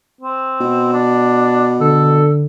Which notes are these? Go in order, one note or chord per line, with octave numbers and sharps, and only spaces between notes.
C4
B2
D4
D3 A4